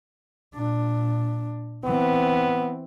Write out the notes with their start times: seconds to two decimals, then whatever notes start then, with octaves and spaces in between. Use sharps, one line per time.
0.55 A#2 D4
1.84 E3 B3 C4